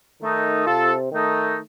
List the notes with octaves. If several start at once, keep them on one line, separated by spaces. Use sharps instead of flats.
D#3 A3 D#4
C3 F4 A4
D#3 A3 D#4